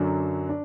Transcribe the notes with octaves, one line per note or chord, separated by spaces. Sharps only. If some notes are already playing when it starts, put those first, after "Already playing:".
Already playing: F#2 D3 F#3 D4
D4